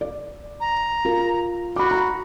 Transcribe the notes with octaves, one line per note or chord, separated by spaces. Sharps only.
D5
A#5
F4 A#4
F#4 B5 D6
A#5 B5